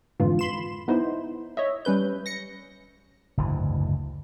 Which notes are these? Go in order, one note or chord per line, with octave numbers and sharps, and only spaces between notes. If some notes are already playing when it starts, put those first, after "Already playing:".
G#1 F2 G#2 D3 E3 F4
B5 C6 E7
B3 D#4 E4 C5
C#5 D#5 E5
G3 C#4 B4 G6
A#6 C#7
F#1 D2 G#2 E3